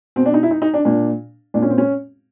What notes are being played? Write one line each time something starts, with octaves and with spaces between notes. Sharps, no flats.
B2 C4
D4
D#4
E4
D#4
D#4
D4
A#2 D4
A#2 D4
C#4
C4
C#4